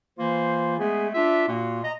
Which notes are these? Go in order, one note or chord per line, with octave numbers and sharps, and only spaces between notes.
E3 A#3 F4 C5
G#3 A3 B3 G#4
D4 F4 E5
A#2 A#3 F4 F#4
D#5 A#5